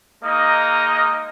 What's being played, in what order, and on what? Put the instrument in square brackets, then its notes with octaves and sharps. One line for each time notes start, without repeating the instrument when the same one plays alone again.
[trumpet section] G#3 A#3 D#4 D#5